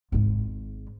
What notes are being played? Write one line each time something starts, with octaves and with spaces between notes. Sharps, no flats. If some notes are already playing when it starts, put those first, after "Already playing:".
G#1 G#2